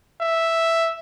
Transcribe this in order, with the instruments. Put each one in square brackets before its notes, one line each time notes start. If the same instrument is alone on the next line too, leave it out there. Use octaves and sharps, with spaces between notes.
[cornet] E5